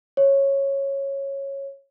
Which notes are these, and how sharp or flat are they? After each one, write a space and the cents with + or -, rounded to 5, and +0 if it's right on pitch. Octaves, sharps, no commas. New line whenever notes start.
C#5 -10